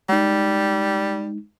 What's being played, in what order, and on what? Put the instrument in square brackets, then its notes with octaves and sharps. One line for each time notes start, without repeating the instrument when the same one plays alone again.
[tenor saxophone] G3 [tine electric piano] G#3 D#4